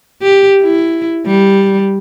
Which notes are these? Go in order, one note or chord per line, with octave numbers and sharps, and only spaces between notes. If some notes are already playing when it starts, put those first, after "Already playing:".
G4
E4
G3